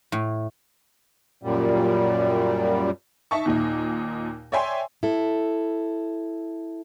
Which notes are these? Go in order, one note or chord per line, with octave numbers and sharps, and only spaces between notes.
A2
F#2 A#2 G3
D#4 E5 A5 C#6
D#2 A#2 D#4
C#5 D5 E5 G5 G#5 C6
E4 A4